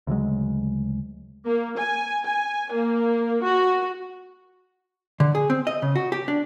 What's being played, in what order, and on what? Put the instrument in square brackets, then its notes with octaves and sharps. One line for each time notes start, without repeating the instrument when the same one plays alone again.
[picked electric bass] D2 C#3 F#3 G#3
[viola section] A#3
G#5
G#5
A#3
F#4
[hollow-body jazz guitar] D3
G#4
C4
D#5
C#3
F#4
G4
D4